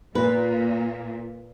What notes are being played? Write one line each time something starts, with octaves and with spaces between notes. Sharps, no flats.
A#2 B4